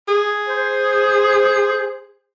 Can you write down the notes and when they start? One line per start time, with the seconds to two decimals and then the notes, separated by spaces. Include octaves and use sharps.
0.08 G#4
0.48 C5